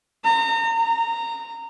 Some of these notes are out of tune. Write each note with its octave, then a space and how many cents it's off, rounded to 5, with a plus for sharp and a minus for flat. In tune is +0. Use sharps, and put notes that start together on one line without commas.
A#5 -35
A#5 -15